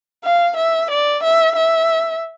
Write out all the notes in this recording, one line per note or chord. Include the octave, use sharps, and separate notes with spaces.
F5
E5
D5
E5
E5